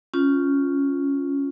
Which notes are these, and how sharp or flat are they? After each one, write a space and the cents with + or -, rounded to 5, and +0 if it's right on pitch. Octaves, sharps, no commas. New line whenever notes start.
C#4 +0 F4 +0